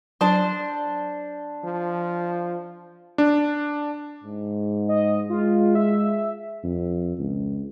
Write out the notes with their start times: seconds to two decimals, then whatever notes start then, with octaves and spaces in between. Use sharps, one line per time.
0.21 F#3 D4 C5
1.64 F3
3.18 D4
4.24 G#2
4.89 D#5
5.29 G#3 F4
5.75 E5
6.64 F2
7.18 C#2